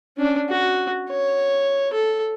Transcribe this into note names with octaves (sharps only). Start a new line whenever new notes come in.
C#4 D4
F#4
C#5
A4